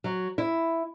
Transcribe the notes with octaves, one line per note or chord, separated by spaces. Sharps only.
F#3
E4